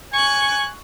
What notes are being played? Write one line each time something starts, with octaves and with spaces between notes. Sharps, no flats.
G#5 C#6 F#6